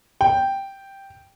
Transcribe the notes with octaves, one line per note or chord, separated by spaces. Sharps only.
G5